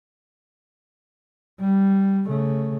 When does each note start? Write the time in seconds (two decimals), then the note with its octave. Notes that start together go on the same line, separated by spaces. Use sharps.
1.60 G3
2.27 C#3 A3